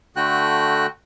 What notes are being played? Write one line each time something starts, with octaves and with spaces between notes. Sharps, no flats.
D3 A3 F#4 G5 F#6